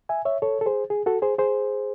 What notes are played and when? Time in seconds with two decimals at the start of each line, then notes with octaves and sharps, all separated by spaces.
0.09 E5 G#5
0.25 C#5 E5
0.42 A4 C#5
0.61 A4
0.66 G#4 C5
0.90 G#4
1.06 F#4 A4
1.22 G#4 C5
1.38 G#4 C5